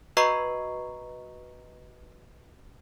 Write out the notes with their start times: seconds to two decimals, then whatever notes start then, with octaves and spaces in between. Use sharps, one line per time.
0.17 F#4 B4 D#5 A#5 C#6 C7